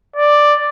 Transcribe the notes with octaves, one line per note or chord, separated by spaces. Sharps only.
D5